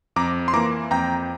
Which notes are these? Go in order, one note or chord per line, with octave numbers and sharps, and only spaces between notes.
F2 A#5 D6
C6
E3 A#3 A#5 D6
F2 G5 A#5